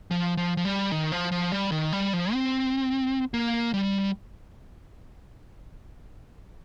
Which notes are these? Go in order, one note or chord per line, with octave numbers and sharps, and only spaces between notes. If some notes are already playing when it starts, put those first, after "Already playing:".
F3
F3
F3
G3
D#3
F3
F3
G3
D#3
G3
F3
C4
A#3
G3